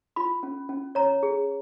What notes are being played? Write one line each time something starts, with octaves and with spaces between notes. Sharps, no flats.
F4 B5
C#4
C#4
C#5 A#5
G#4